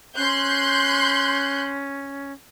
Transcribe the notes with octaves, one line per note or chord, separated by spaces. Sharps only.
C#4 C6 F#6 G6